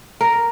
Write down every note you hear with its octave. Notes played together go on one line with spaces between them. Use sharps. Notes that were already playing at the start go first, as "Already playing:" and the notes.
A#4